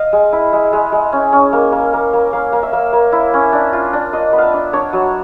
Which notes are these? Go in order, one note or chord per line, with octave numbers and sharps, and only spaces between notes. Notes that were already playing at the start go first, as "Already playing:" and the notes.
Already playing: D#5 F5
G#3
E4
G#3
G#3
G#3
C#4
C#4
A#3
A#3
A#3
A#3
A#3 F5
A#3
E5
A#3
A#3
E4
C#4
D4
F4
D4
F4 D#5
B3
E5 F5
D4
D4 C#5
F#3